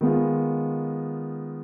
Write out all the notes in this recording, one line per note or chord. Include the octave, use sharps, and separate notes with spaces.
D#3 G#3 B3 F4